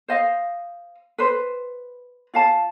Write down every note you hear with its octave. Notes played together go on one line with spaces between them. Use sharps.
C5 D#5 F5
B4 C5
F4 F5 A5